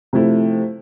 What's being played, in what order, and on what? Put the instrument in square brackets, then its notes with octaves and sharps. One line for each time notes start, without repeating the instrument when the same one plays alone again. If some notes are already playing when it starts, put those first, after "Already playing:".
[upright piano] C3 F3 A3 E4